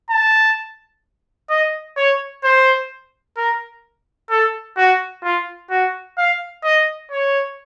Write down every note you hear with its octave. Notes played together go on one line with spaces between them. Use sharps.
A5
D#5
C#5
C5
A#4
A4
F#4
F4
F#4
F5
D#5
C#5